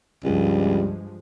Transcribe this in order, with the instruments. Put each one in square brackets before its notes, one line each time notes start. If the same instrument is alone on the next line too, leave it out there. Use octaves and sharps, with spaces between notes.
[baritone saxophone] C#2 [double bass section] G2 F3 G#3 [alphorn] G3